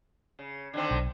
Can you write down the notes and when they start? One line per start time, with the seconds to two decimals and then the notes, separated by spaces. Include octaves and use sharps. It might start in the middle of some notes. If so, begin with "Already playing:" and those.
0.39 C#3
0.73 D3 D#3 C4
0.91 B1